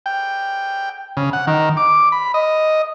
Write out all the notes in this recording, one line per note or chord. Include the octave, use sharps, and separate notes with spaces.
G5
C#3
F#5
D#3
D6
B5
D#5